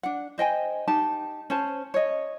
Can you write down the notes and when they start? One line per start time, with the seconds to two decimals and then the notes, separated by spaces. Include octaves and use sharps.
0.03 D4 F#5
0.38 C5 D#5 G5 G#5
0.88 D#4 G4 A5
1.50 C#4 C5 A5
1.94 C#5 D#5